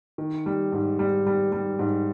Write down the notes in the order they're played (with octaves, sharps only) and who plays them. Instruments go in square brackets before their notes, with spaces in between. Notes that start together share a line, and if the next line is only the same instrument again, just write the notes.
[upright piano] D#3
G3
G#2
G3
G3
G3
G#2